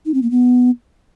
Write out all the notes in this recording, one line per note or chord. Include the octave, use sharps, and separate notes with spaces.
D#4
C4
A#3
B3